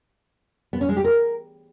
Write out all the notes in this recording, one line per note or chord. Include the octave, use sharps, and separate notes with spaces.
B3
C#4
G#3
G4
A#4